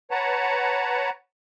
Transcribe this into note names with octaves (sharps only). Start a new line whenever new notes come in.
B4 C#5 F#5 A5 A#5